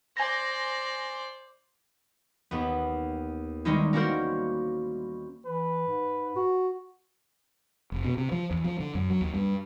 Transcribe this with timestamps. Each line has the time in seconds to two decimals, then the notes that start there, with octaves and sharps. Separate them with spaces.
0.17 C5 D5 G#5 A#6
2.51 D#2 B3
3.65 D#3 G3 G#3 C#4 D#4 E4
3.93 A#3 C#4 E4 F#4 A#4 C5
5.46 E3 B4
5.87 G#2
6.36 F#4
7.92 F1
8.05 B2
8.17 C3
8.32 F3
8.51 E2
8.64 F3
8.80 D3
8.95 F#2
9.10 F#3
9.21 D#2
9.34 G2